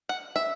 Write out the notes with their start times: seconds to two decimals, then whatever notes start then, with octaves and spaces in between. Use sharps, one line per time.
0.09 F#5
0.36 E5